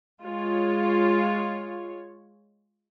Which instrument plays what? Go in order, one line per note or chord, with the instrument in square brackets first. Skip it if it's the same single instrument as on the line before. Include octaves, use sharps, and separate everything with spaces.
[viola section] G#3 F4 C#5